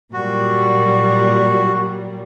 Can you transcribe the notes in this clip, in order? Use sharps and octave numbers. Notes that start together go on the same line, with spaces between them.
A#2 F#3 G3 F#4